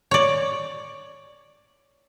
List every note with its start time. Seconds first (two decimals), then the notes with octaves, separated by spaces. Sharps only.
0.11 C#5 D5